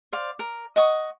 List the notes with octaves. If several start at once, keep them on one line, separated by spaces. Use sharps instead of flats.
C5 D5 F5
A#4
D#5 F#5 C#6 D#6